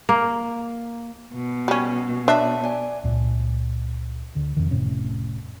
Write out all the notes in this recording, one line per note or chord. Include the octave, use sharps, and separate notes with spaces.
A#3
B2
G3 C#4
D4 C#5 E5 A5
D5 G#5
C#2 A#2
D2 D3
F2 C3 D#3
F1 A2 C3 C#4